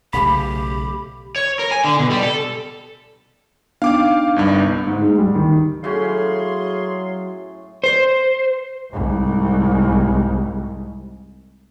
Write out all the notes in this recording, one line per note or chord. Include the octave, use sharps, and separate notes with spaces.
B1 C#3 A3 G4 B5
C#5
A#4
G#5
D3
B2
G3
A4
B3 D4 D#4 F5 G5 D6
G1 C2 G2
G#2
G#3
G3
D#3
A2 F#3 C#4 G#4 F5 C6
C5
C2 G#2